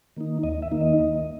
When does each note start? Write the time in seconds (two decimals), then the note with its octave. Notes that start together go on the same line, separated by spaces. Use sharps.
0.16 D#3 A#3 D#4
0.43 D#2 D#5
0.62 E5
0.71 D#3 A#3 D#4
0.81 D#5
0.99 D#2